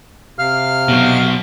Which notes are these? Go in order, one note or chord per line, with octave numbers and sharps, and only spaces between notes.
C3 F5 F6
B2 F#3